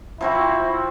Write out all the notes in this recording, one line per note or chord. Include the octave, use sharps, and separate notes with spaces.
F3 C4 E4 F#4